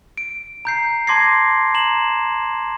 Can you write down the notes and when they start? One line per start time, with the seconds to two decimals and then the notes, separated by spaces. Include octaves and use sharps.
0.18 D7
0.65 A#5 G6 C7
1.07 A5 C6 D6 G#6 A#6 C7
1.74 A#5 E7 F#7